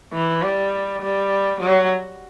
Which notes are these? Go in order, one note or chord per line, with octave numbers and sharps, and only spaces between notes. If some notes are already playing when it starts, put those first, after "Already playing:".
E3
G3
G3
F#3